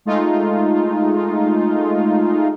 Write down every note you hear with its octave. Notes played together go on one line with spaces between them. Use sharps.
G#3 A3 D#4 F4